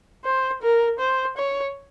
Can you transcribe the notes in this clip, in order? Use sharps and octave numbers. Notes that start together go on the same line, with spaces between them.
C5
A#4
C5
C#5